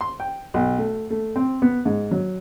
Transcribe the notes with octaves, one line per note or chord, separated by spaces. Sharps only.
C6
G5
B1
A3
A3
C4
B3
G#2
F#3